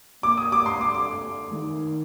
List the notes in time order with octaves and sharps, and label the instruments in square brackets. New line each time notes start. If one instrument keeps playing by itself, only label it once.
[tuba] A#3 [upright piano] D6
[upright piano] D#6
D6
[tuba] A3 [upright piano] C6
[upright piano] D6
D6
[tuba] D#3